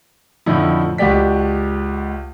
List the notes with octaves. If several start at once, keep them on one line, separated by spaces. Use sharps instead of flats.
F2 A2 D3 F3 D#4 E4
C#2 F#4 G4 D5 B6